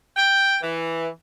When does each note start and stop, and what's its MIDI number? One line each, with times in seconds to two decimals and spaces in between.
0.16 0.57 79
0.62 1.07 52